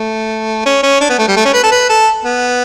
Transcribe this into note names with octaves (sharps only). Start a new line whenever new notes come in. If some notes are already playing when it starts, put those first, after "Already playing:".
Already playing: A3
C#4
C#4
D4
B3
A3
G3
A3
C#4
B4
A4
B4
A4
B3